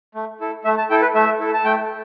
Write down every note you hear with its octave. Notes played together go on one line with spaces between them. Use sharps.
A3
E4 A4
A3 E5
A5
E4 A4 G5
B4
A3 E5
E4 A4
A5
A3 G5